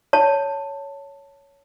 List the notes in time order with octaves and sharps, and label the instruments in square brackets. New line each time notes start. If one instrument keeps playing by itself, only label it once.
[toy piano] C#5 A5